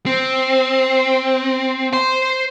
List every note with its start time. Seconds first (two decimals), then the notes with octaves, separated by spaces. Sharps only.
0.06 C4
1.93 C5 C6